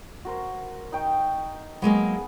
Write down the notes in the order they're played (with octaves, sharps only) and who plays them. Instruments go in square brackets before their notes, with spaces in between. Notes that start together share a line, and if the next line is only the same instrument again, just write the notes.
[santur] F#4 A#4 C5
D#4 G5 C#6
[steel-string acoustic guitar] F#3 G#3 A#3 [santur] B3 G#4